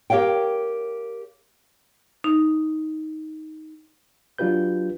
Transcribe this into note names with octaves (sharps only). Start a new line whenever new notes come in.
G4 A#4 C#5 F5 G5
D#4
F#3 D4 F4 G4 B4 G6